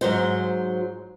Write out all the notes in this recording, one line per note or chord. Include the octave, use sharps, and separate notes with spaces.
G#2 F#3 C5